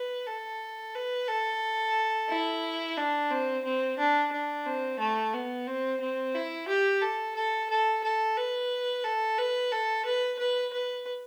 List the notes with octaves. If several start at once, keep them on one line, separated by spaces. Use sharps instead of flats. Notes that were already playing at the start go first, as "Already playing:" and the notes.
Already playing: B4
A4
B4
A4
E4
D4
C4
C4
D4
D4
C4
A3
B3
C4
C4
E4
G4
A4
A4
A4
A4
B4
A4
B4
A4
B4
B4
B4